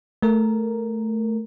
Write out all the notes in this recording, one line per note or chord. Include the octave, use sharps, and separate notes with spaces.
A3 A#4